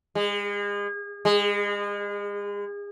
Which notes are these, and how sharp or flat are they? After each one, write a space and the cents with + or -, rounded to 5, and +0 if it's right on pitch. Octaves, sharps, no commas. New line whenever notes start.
G#3 -35
G#3 -35